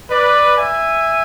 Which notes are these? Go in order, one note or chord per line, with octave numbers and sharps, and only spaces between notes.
B4 D5
E5 G#5